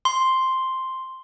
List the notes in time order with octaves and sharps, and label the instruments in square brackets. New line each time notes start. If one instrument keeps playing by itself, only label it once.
[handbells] C6